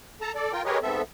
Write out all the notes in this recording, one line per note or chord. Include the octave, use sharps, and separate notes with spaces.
A4 A5 A#5
A4 D5
F4 A#4 G5
G4 G#4 A#4 B4 C#5 D#5
G#2 B3 C4 A4 E5